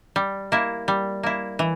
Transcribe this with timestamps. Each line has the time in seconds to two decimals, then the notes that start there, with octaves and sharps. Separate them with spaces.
0.16 G3
0.52 A#3 E4
0.88 G3
1.23 A#3 E4
1.59 E3